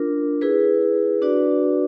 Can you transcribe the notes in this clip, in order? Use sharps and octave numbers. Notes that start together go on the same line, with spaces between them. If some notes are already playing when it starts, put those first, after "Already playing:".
Already playing: D4 F4 A#4
E4 G#4 B4
D4 F#4 B4 D5